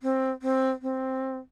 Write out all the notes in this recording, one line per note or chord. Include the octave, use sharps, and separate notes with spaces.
C4
C4
C4